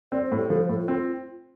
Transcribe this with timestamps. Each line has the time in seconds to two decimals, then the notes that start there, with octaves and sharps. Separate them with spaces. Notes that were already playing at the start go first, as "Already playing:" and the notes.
0.12 C4 D5
0.25 C5
0.32 A2
0.37 G4
0.50 F3 A4
0.59 C5
0.69 A2 A4
0.79 F4
0.88 C4